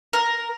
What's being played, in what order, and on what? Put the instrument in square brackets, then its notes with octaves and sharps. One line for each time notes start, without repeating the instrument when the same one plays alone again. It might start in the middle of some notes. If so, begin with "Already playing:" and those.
[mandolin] A#4